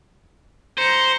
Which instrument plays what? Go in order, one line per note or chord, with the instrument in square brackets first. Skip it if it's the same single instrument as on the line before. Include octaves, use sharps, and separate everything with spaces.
[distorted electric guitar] C5 [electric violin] A#5 C#7